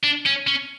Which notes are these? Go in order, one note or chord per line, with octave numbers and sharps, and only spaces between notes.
D4
C#4
C#4